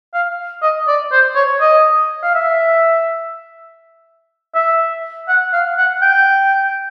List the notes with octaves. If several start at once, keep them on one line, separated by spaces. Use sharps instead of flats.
F5
D#5
D5
C5
C#5
D#5
F5
E5
E5
F#5
F5
F#5
G5